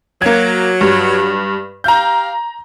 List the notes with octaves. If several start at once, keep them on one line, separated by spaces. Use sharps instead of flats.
F#3 A#3 G#6
G2
G4 F5 A#5 G6